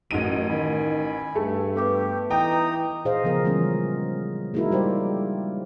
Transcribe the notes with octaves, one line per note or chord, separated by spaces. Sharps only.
A1 F#2 D#4 D#7
D#3 G#5 B5
G2 A3
B3 G4 B4 D6
E3 D#4 G5 A#5 D#6
A#2 G#4 C5 D#5 F5
C#3 F3 B3 A#4
E3 F3 G3 G#3 C#4
G#3 A#3 D#4 E4 F#4 A#4
G3 G4 C5 D5